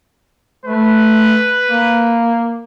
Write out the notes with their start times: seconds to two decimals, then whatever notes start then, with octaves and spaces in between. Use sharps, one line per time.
0.66 A3 B4
1.69 A#3